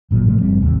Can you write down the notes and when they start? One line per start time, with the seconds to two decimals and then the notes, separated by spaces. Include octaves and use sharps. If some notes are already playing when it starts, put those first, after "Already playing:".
0.11 G#1 A#2 F#3
0.26 A2 C3 F3 A3
0.41 F#1 G3 C4
0.61 A1 D#2 C3